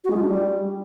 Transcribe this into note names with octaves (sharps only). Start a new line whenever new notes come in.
F#4
G#3
F4
D4
G3